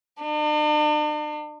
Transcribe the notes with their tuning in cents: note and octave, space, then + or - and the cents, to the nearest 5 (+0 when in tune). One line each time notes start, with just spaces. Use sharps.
D4 +45